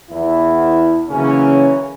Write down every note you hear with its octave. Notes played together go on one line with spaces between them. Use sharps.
E2 E4
C#3 E3 F#3 A#3 C#4